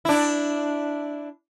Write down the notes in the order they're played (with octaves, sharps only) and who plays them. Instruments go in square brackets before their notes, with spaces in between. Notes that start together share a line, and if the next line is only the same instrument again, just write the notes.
[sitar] D4 E4